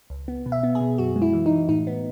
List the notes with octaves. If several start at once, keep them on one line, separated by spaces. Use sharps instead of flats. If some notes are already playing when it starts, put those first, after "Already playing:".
C#2
B3
B2
E5
B3
G#4
B2
F#2 F#4
G#3
E4
E3
D#4
E3
A2 D#4
B3